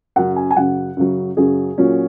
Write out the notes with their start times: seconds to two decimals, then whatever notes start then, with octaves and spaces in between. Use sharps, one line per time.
0.16 F#2 C#3 F#3 F#5
0.36 G#5
0.51 G#5
0.56 F#2 C#3 F#3 F#5
0.97 F#2 C#3 F#3
1.37 F#2 C#3 F#3 G#4
1.78 A#2 F#3 C#4